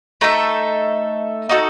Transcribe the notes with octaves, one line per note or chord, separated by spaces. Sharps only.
A3 D#4 A4 E5
D#4 F#4 A4